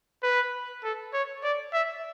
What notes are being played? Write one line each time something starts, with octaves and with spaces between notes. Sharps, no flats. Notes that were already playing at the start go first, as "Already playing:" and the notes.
B4
A4
C#5
D5
E5